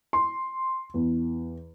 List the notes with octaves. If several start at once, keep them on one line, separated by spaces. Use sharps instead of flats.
C6
E2